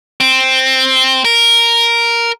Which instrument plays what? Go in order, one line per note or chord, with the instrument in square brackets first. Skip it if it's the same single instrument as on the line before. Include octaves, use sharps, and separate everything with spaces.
[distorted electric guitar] C4
A#4